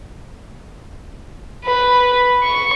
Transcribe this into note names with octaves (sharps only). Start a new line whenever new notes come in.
B4
C#6